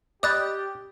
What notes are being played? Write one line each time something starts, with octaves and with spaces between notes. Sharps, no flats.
G4 D5 D#5 B5 D#6 F#6 G6 A6